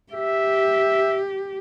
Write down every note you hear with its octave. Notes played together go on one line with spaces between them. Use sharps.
G4 E5